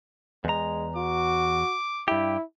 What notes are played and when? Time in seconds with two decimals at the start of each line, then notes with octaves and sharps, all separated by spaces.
0.45 E2 G#3 A#5
0.96 F#4 D6
2.08 G2 E4 G4